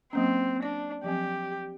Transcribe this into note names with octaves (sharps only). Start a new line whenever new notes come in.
F#3 A#3 C4 C#4
D4 D5
F3 F#3 C4 G4